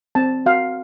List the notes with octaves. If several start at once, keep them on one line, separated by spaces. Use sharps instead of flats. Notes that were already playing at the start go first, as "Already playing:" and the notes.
C4 A5
F#4 F5